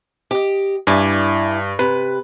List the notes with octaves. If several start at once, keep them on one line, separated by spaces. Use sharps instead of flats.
G4 D#5
G2 E4 D5 G#5
C3 B4